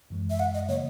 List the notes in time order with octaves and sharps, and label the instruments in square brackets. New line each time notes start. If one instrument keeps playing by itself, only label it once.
[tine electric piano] F#2 E3 G#3
[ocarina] E5
F#5
D#5
[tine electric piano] C#3 F#3 A#3 [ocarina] C#5